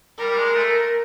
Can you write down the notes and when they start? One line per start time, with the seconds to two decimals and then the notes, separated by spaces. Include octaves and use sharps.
0.18 G3 A#4
0.29 G3
0.37 G#3
0.49 G#3
0.56 A3